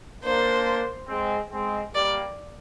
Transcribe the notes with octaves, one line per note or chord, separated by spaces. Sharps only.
A#3 D4 C5
G#3 C4
G#3 C4
G3 A#3 D5